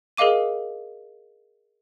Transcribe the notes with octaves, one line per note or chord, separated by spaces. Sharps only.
G#4 A#4 D#5 F5 D6 D#7